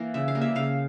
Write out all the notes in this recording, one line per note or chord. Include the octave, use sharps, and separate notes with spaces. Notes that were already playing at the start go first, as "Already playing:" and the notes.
Already playing: E3 A#3
C#3 E5
F5
E3 G3 A#3
E5
C#3 F5